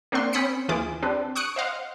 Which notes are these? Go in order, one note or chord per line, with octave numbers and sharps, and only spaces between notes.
A#3 C4 D4 F#5 C6
C4 C#4 B5 D#6 B6 C#7
D#2 E3 F4 G#4 D6
C4 D4 G4 B4
C#6 D#6 F#6 C#7 D7
C5 D#5 F5 F#5